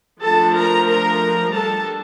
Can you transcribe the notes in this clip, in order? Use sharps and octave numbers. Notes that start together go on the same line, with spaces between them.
F3 A3 D4 A4 A5
A#4 A#5
A#4 A#5
G3 D4 A4 A5